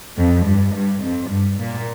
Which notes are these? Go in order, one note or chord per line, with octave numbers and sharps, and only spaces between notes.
F2
G2
G2
F2
G2
A#2